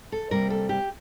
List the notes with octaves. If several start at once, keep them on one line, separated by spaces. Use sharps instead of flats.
A4
C3 G3 A#3 A#4
A4
G4